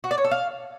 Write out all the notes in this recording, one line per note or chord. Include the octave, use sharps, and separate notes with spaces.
F#4
D5
C#5
A4
F5